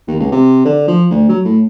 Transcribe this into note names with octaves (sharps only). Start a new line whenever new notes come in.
D#2
C#2
C3
D3
F3
D2
F#3
A2